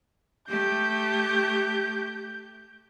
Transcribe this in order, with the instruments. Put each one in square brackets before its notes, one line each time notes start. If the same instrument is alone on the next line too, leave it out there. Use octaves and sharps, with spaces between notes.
[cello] A3 G4 [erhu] G6